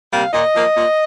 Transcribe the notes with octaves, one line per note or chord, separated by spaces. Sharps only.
C3 G3 A#3 F5
A#2 D#5
F3 A#3
A#2